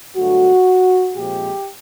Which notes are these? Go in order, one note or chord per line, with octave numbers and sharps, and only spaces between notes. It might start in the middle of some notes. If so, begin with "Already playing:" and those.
G2 D3 F#3 A3 F#4
A#2 F3 G#3 C4 G4